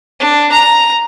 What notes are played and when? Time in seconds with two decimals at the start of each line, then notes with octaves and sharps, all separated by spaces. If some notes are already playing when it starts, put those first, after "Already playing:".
0.20 D4
0.52 A#5